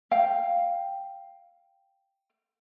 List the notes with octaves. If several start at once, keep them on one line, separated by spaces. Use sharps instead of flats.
F5 G5